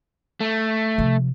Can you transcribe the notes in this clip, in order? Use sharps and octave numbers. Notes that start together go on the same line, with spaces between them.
A3
C3 F3